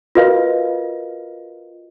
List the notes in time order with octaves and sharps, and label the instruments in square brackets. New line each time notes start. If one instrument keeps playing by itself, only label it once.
[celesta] F4 F#4 A#4 B4 D#5 F5